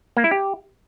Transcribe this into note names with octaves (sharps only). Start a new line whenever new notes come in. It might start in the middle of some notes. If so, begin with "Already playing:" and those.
A#3
E4
G4